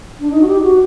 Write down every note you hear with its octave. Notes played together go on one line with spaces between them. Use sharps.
D4
D#4
F#4
G4
F#4